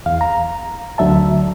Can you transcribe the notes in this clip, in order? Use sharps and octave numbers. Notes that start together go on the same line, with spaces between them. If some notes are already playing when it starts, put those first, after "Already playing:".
E2 F5
A#5
D2 D3 F#3 E5 A5